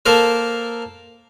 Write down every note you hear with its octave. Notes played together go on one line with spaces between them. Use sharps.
A#3 A4 A#4 C5